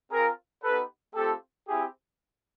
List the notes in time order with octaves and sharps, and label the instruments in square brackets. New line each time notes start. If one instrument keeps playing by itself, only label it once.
[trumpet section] C4 F4 G#4 A#4
B3 D#4 G4 A4 B4
A3 C4 F4 G4 A4
C4 E4 G4 G#4